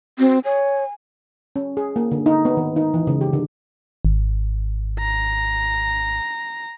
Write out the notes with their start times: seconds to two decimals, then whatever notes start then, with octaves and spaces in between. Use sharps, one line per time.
0.19 C4 F#4
0.45 C#5 G#5
1.56 C#4
1.77 G#4
1.96 A#3
2.12 D3
2.26 D#4
2.45 B3
2.57 D#3
2.76 D#4
2.94 E3
3.07 C#3
3.21 G4
3.33 D3
4.05 G#1
5.00 A#5